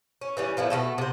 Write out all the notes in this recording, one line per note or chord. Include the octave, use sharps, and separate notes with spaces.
C#4
E3 G3 C#4
A2 E3 F3 B3
B2 E3 A3 A4
C3 C5